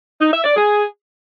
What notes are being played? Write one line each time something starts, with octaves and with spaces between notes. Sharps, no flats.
D#4
E5
D5
G#4